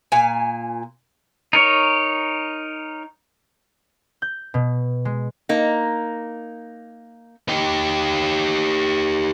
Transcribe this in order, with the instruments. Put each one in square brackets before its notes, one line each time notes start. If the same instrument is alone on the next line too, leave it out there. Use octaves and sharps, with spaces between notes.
[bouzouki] A#2 G#5
[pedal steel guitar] D#4 A#4 C#5
[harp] G6
B2
G#3
[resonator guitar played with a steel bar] A#3 D#4
[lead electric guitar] D#4 G4